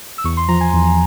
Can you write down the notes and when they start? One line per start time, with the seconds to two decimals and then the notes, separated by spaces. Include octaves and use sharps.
0.18 E6
0.24 E2 C#6
0.37 C6
0.48 F3 A#5
0.61 G#5
0.73 E2